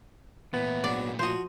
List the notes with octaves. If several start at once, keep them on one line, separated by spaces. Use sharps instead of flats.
A#2 E3 A3 B3
G#2 F#3 D4 D5
F3 F4 F#4 C5 D#5